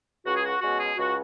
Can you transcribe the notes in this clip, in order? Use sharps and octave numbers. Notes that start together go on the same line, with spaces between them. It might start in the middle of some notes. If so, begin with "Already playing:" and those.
C#2 F#4
G#4
F#4
B2 G#3 C#4 F#4
G#4
C#2 F#4